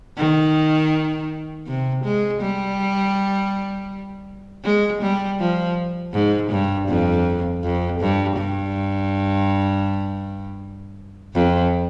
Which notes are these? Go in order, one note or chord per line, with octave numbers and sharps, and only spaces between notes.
D#3
C3
G#3
G3
G#3
G3
F3
G#2
G2
F2
F2
G2
G2
F2